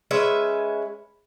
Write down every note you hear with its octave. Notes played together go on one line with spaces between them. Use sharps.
G#3 C#4 B4 E5